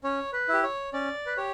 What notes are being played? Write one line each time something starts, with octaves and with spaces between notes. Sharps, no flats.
C#4 C#5
B4
E4 G4
C#5
C#4 D5
B4
G4 C#5